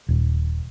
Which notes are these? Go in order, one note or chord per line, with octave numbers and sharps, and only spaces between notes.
D#1